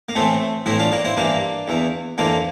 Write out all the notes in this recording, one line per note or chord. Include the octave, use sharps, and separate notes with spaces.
A#3
A2 E3 A3 C4
A2 E3 C4 E4
D4 F4
A#3 D4
C4 E4
G2 E3 A#3 D4
E2 E3
F2 E3 A#3 D4